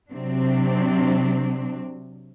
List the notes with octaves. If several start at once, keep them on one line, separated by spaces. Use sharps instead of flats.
C3 F#3 C4 D4